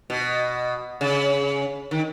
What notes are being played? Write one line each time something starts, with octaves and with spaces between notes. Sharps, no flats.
B2
C#3
D#3